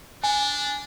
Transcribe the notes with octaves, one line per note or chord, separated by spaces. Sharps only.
D4 G#5